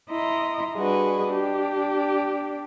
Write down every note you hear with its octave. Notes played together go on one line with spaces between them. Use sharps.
E4 D#5 A#5 C6
G3 D4 F#4 G#4 B4 D#5
D4 G4